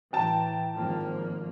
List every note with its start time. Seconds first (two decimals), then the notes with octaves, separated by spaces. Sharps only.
0.13 A2 E3 G5 A5 A#5
0.76 G#1 F3 A#3